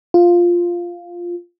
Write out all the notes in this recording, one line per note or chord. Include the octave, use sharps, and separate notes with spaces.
F4